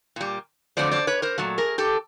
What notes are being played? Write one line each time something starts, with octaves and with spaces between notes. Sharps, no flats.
A#2 G3
F2 D3 F#3 A3 C5 D5
C5 D5
B4 C#5
A#4 C5
A#2 F#3 A3
G#4 A#4
G4 A4